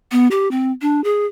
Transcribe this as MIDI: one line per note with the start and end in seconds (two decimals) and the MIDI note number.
0.12 0.28 59
0.31 0.50 67
0.51 0.72 60
0.82 1.03 62
1.04 1.26 68